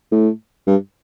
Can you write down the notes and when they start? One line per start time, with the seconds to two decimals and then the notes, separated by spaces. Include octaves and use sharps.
0.12 A2
0.67 G2